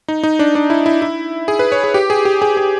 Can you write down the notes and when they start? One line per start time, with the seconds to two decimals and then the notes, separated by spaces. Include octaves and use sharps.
0.08 D#4
0.23 D#4
0.39 D4
0.55 D4
0.70 E4
0.86 E4
1.02 E4
1.48 G#4
1.59 B4
1.72 C#5
1.84 G#4
1.94 G4
2.10 G#4
2.25 G4
2.42 G#4
2.57 G#4